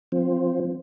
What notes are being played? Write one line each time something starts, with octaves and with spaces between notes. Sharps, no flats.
F3 C4